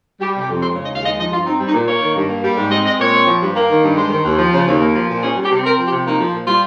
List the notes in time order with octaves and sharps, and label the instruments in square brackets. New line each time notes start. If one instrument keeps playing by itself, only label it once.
[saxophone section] G3 G4
C3
G4
F2
G#3 C5
C#3
D#5
D#2 F5
G#3 D#5
F3 D#5
G2 F4
C4 D#4
G3
D#4
A#2
A#3 C#5
D#3
G2
A#3
G3
G#2
C4 D#5
G#3 D#5
A#2 C#5
C4
F3
G2
A#3
D#3
G2
G#3 C5
D#3
D#2
F3
C#3
D#2
A#3
F3
A#2
C#4 G#4
G3
G4
C3
C4 A#4
F3
G4
C3
A#3 D#4
F3
A#2
G3 F4